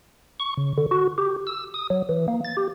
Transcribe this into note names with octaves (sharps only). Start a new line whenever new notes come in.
C#6
C#3
D3
F#4
G4
E6
D#6
F#3
E3
A#3
A6
G4